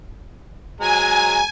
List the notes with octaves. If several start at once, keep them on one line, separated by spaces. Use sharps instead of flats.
F#3 G#3 G#5 A#5